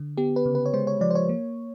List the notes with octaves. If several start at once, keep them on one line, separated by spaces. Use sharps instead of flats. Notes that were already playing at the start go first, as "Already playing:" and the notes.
Already playing: D3
B3 G4
B4
C#3
B4
C#5
G#3 C5
C#5
F3 D5
C5
C#5
A#3